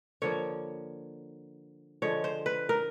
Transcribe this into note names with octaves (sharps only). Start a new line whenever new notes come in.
D3 F3 A#3 C#5
D3 F3 G#3 C#5
C5
B4
A#4